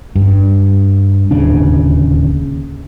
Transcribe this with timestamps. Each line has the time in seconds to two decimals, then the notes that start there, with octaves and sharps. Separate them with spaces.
0.15 G2
1.31 D1 D#2 C#3 D4